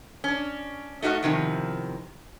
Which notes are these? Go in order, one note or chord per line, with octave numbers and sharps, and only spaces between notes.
C#4 D4
A3 D#4 F#4 D5 F5
E2 C3 D#3 F3